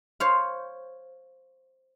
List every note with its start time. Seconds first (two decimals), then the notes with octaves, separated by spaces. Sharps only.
0.20 C5 C#5 F5